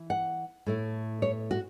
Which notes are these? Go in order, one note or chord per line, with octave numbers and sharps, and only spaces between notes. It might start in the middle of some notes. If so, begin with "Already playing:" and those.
Already playing: E3 E4
F#5
A2 A3 E4
C#5
F#4